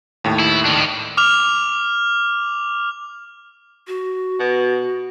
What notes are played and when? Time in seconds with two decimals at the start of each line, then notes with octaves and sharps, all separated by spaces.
0.24 D#2 A2
0.40 E4
0.65 D#3 D4
1.17 D6 F6 F7
3.87 F#4
4.40 B2